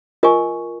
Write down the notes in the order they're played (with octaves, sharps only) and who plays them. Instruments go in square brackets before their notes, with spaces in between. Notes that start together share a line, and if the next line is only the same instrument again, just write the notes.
[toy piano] F4 A#4 D#5 G#5 C#6